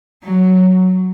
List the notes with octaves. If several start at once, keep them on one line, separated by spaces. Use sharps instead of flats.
F#3